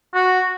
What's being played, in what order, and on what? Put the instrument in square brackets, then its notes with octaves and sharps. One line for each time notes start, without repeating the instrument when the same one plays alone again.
[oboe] F#4